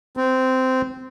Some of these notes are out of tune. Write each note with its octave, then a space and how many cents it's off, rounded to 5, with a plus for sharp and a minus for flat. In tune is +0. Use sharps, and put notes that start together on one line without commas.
C4 -15